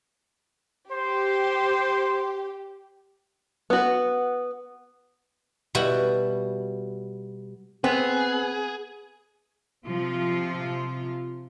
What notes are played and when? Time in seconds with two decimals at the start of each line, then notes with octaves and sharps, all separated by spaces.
0.92 G4 C5
3.70 B3 F#4
5.75 B2 G3 E4 F#4
7.84 B3 C4 G#4
9.85 C3 F3 F4